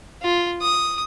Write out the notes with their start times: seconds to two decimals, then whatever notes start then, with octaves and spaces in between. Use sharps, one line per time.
0.22 F4
0.61 D#6